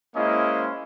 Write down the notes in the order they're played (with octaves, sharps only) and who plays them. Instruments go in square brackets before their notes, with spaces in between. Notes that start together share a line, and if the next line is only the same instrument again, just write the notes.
[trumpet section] G#3 A#3 C#4 E4 C5 D#5